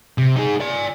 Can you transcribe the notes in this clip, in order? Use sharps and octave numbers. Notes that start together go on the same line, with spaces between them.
C3
D#4 G#4
D5 G#5